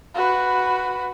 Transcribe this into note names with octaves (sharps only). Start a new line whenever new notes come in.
F#4 B4